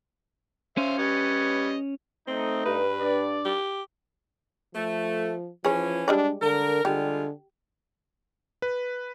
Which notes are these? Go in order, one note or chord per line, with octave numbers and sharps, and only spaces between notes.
C#4 C5 E5 F5
G3 B4 C#5 D#5
A3 C4 D#4
G2 B4
D4 D5
G4
F3 A3
E3 F3 C#4 G#4 C#5
G3 G#3 D4 D5
D3 A#4
D3 G3 G#3 F4 G4
B4